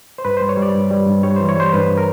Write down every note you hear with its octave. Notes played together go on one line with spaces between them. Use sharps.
C5
G2 B4
C5
G3
C#5
G3 D5
G2
G3
G2
G3 C#5
C5
E3
C#5
G3 C5
G2 B4
A#4